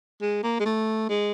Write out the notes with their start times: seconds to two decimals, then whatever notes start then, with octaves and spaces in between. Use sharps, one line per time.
0.21 G#3
0.43 A#3
0.60 G#3
0.65 A3
1.09 G#3